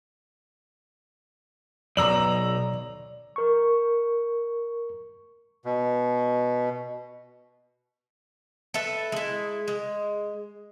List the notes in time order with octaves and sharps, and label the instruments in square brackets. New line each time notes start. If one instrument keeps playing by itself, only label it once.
[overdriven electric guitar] B1 [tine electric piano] D5 [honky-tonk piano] A#5 E6 F#7
[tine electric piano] A#4 C#6
[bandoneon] B2
[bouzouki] A4 B4 E5
G#3 E4
G#3